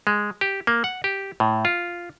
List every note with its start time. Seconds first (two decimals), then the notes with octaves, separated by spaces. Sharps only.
0.07 G#3
0.41 G4
0.67 A#3
0.84 F#5
1.04 G4
1.40 A2
1.65 F4